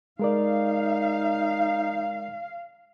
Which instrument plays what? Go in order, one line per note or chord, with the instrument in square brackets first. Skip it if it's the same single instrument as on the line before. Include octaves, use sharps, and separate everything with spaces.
[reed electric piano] G#3 A#4 D5 [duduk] D#4 [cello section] F5